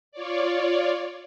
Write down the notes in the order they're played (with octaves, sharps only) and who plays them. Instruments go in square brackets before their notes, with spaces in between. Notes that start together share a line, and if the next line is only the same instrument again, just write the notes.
[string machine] F4 C#5 D5